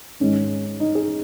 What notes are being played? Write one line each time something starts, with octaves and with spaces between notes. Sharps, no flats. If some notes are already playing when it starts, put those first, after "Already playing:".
G#2 D#3 G#3 C#4
D#4
G#4